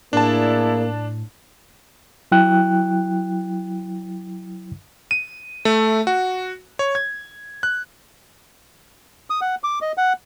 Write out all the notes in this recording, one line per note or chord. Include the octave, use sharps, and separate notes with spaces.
A2 A#3 D4 E4 G#4 D5 A5
F#3 E4 G5 F#6
D#7
A3
F#4
C#5
G#6
F#6
D#6
F#5
D6
D#5
F#5